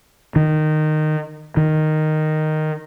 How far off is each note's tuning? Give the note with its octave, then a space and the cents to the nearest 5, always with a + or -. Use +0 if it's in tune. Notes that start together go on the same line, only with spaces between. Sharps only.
D#3 -15
D#3 -5